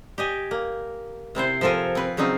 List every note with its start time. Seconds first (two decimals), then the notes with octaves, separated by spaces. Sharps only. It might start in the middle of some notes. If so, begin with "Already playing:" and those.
0.18 G4 D#5 G#5
0.51 A#3
1.35 C3 C4 E4 C5
1.61 F3 C4 A4 A#4 G#5
1.95 C4 B4
2.17 C#3 F#3 C4 D#4 F4